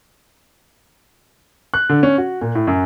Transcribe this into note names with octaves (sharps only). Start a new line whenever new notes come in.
F#6
D3
C#4
F#4
A#2
A2
F#2